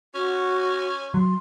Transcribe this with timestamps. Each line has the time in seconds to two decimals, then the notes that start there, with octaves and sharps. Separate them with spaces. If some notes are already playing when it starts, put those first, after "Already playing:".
0.15 C#4 F#4
1.14 F#3 C6